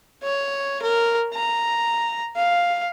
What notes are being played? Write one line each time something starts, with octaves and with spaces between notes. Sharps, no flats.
C#5
A#4
A#5
F5